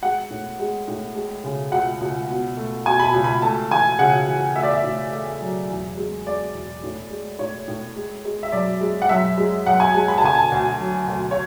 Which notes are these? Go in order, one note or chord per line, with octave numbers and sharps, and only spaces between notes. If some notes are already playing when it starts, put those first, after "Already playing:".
G#3 F#5
A2
G#3
A2
G#3
C#3
C#2 F#5
C#2
B2
A3
B2 G#5
B5
A5
C#2
B5
A3 A5
E3 G#5
C#3 F#5
E3
A3 E5
D5
E5
A2
A3
F#3
E2
G#3
G#3 D5
E2
A2
G#3
A2 C#5
A2
G#3
G#3
E5
F#2 D5
G#3
F#5
F#2 E5
G#3
F#2 F#5
G#5
G#3 A5
B5
A5
D3 G#5
A5
D2
F#3
D2
C#5